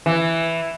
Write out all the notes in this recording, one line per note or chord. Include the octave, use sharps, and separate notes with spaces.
E3